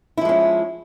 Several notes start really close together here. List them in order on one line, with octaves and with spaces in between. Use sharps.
E4 F3 G#3 C#4